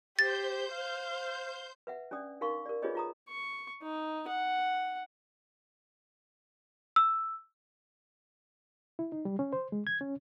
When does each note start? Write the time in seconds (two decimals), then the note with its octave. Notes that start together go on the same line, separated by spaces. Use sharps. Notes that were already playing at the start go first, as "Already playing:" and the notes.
0.19 G4 C5 G6 A6
0.73 F5
1.87 B4 E5 F#5
2.11 C#4 D4 D5 D#6
2.41 D#4 A#4 F5 C6 C#6
2.66 A#4 D5
2.82 D4 F4 G#4 B4 C#5 D#5
2.95 F4 A#5 D#6
3.29 C#6
3.83 D#4
4.28 F#5
6.96 E6
8.99 E4
9.12 D#4
9.25 G3
9.39 C#4
9.53 C5
9.72 G#3
9.87 G#6
10.01 C#4